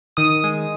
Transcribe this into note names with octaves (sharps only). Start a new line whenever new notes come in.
D#3 D#6
G#3